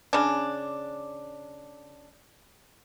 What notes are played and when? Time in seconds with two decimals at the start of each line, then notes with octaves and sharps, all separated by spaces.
0.13 C#3 D4